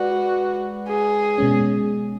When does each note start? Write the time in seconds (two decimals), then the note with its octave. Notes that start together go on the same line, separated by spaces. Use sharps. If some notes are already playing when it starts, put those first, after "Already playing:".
Already playing: G#3 F#4 B4 D5
0.88 G#4
1.38 B2 G#3 C#4